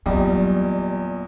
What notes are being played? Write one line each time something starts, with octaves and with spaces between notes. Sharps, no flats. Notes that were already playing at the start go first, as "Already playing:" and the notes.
E2 A#2 F#3 G3 D#5